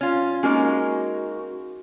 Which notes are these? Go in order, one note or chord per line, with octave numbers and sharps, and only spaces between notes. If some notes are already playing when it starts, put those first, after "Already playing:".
C#4 F4
G#3 A#3 C#4 D#4 F#4